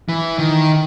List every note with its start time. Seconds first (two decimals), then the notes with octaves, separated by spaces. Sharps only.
0.09 E3
0.39 D#3